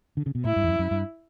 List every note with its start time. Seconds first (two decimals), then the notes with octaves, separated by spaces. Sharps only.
0.17 D3
0.26 C#3
0.35 B2
0.44 A2 E4
0.56 G2
0.63 E2
0.68 F#2
0.79 F#2
0.91 G2